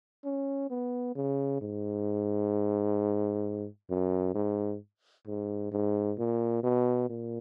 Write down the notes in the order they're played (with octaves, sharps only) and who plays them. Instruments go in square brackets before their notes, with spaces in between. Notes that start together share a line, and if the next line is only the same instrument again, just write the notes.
[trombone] C#4
B3
C#3
G#2
F#2
G#2
G#2
G#2
A#2
B2
A#2